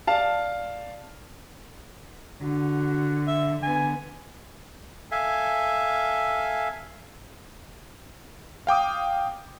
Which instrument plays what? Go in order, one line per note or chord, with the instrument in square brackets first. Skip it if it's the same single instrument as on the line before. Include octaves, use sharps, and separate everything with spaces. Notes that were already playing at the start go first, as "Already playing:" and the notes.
[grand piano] D5 F5 A5
[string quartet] D3 [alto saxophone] F#4
[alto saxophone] E5
[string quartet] D3 B3 [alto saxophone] G#5
[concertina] A4 E5 F5 G#5
[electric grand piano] F5 G5 D6 D#6